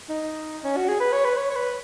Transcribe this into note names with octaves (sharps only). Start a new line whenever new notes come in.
D#4
C#4
F#4
G#4
B4
C#5
B4
C#5
C#5
B4